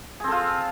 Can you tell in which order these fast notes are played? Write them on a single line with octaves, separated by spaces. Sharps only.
G#4 C4 A4 F4